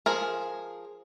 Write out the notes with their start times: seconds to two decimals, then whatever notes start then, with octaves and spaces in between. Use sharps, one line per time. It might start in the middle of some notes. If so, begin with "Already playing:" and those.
0.06 F3 G#4 A#4